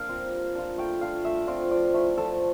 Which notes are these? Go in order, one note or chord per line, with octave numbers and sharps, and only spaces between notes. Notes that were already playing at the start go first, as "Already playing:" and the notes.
Already playing: A#3 D4 A#4 F5
C4 F4
G3
D4 F4
A3 G5
D4 F4 F5
A3 E5
C4 F4 D5
F3 D5
A3 E4
F3 A4